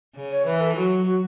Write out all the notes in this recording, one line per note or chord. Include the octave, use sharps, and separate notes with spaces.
C#3
C#5
E3 B4
A4
F#3 F#4
F#4